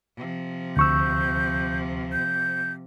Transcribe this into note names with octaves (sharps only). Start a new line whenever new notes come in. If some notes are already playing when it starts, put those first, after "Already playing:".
C3 F3
D2 C#6 E6 G6
G6